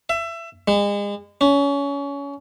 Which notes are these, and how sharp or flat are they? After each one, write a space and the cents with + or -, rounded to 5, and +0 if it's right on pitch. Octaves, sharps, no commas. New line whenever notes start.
E5 +25
G#3 -35
C#4 +25